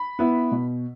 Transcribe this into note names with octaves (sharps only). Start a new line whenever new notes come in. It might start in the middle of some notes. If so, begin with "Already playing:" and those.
Already playing: B5
B3 E4
B2